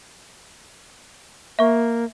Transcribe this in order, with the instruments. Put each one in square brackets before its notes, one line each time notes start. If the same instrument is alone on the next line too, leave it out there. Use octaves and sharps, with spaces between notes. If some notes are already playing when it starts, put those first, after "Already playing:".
[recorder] A#3 [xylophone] E5 C#6